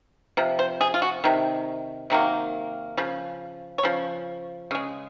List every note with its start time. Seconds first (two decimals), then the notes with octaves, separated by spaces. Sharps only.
0.37 C3 F3
0.59 C5
0.81 G#4
0.94 F4
1.02 F#4
1.24 C3 D#3
2.10 C3 D#3 F#3 A#3
2.97 C#3 F3
3.78 C#5
3.83 C#3 F3
4.71 C#3 G#3